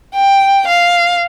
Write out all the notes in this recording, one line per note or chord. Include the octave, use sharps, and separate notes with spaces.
G5
F5